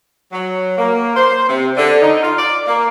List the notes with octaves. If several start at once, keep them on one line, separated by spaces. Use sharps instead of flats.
F#3
A#3
C5
C3
D3
D#4
F4
D5
A#3